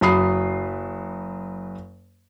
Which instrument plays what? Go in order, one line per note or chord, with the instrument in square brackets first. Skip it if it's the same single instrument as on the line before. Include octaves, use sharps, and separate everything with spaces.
[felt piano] F#1 F#3 B5 D#6 C7